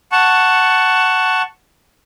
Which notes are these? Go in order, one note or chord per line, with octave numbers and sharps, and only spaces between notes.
F#5 A5 C#6